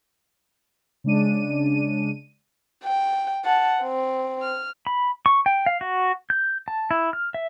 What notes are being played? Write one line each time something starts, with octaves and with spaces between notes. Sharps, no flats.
C#3 G#3 D4 D#7
G5
F#5 A5
C4
F6
B5
C#6
G5
F5
F#4
G6
A5
E4
F6
E5